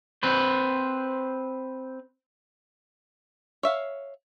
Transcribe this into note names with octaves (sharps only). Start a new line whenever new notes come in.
C4 B4 C5
C#5 E5 F5